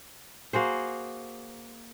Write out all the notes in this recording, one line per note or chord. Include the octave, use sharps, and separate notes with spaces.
A#3 F#4 G#4 C5